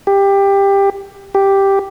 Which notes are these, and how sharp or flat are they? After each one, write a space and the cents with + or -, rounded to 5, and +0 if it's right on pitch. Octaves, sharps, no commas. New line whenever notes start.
G4 +15
G4 +0